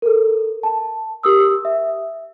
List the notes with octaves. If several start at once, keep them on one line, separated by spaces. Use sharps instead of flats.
A4 A#4
A5
G4 A#4 D#6 E6
E5